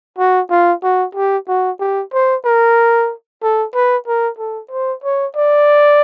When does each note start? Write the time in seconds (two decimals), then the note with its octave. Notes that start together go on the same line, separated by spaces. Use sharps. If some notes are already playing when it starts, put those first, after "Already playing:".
0.18 F#4
0.50 F4
0.83 F#4
1.15 G4
1.48 F#4
1.80 G4
2.13 C5
2.45 A#4
3.43 A4
3.75 B4
4.07 A#4
4.39 A4
4.71 C5
5.04 C#5
5.36 D5